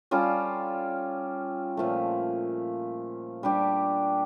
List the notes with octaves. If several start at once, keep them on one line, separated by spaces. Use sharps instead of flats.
G3 C#4 F4 A4
A#2 F3 A3
G3 D4 G4